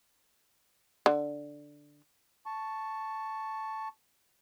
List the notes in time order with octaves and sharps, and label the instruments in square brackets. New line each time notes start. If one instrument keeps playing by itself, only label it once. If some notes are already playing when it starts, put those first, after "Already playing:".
[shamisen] D3
[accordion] A5 C#6